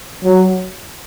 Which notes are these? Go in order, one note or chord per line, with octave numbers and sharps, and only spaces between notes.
F#3